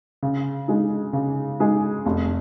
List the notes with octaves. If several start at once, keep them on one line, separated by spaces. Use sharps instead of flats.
C#3
G#3 D#4 G#4
C#3
G#3 D#4 G#4
F1